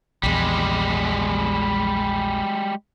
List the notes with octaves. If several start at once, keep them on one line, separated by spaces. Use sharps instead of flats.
A#1 E2 G3 G#3